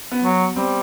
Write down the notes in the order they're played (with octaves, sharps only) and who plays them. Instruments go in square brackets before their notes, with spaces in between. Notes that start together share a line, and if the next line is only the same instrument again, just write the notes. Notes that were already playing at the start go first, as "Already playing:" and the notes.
[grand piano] B3
[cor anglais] F#3
[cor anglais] G3 [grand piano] C4